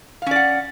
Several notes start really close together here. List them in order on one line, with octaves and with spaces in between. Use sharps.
F5 C#4 D5 F#5